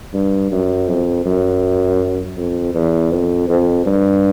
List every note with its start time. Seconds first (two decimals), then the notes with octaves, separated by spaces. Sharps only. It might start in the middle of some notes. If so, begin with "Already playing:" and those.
0.13 G2
0.52 F#2
0.88 F2
1.25 F#2
2.37 F2
2.75 E2
3.11 F2
3.49 F2
3.86 G2